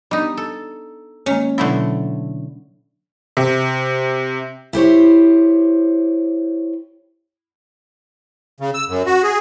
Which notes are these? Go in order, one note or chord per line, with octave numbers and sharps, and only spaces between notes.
G3 B3 D4 D#4 D#5
A4
D#3 G#3 A#3 C#4
B2 D3 F#3 A3 E4
C3
E4 G4 C5 C#5
C#3
E6
F#2
F#4
G#4